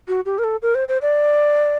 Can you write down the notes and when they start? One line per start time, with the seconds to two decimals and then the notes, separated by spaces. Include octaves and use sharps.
0.08 F#4
0.26 G4
0.38 A#4
0.44 A4
0.62 A#4
0.75 C5
0.88 C5
1.02 D5